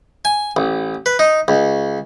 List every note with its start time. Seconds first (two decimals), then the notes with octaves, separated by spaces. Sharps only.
0.25 G#5
0.57 A1
1.06 B4
1.19 D#4
1.48 C#2